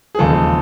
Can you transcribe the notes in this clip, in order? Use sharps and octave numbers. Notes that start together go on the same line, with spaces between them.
G#4
E1 D#2 C#3 F3 A4